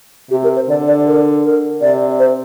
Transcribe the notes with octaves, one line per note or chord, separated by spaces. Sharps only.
C3 G4
A#4
C5
D3 D5
D5
A#4
A#4
C3 D5
C5